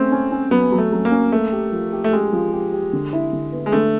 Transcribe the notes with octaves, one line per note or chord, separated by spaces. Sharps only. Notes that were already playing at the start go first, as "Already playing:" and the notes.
Already playing: A3 C4 C#4
C#4
C#4
F#3 B3
F#3
A3
F#3
A#3
C#4
A3 A#3
G4
F3
G4
A3
G#3 G4
F3
G4
G4
D3
E4
D3
B3
G#3
D3 A3